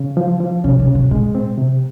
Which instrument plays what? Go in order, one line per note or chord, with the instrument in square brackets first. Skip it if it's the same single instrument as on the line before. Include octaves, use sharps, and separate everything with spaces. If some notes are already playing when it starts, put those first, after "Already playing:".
Already playing: [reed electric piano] C#3
F3
F3
[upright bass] C3 [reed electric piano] C#4
[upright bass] C3
[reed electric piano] C#3
[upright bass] C3
[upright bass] A#2 [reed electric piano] G#3
[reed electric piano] C4
C3